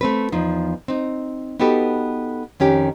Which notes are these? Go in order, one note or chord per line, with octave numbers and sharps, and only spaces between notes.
A3 C4 B4
E2 F3 D#4
C4 D#4
B3 D#4 F#4 G4 A4 B4
F2 D#3 C#4 G4